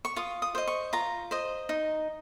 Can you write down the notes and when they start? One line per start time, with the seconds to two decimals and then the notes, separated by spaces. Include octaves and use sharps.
0.05 C#6
0.16 F4 D#6
0.42 D#6
0.55 C5 D#5
0.67 C#6
0.93 F4 A#5
1.31 C5 D#5
1.69 D#4